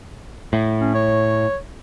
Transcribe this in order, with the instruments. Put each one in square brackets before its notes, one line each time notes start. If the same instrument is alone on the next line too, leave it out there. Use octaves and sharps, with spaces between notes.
[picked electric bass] A2
[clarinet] C#4
C#5